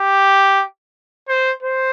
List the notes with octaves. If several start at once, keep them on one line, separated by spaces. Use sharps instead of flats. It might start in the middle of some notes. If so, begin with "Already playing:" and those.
Already playing: G4
C5
C5